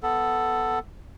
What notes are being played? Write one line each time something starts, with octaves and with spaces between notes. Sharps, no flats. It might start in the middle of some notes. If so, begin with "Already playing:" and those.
B3 A4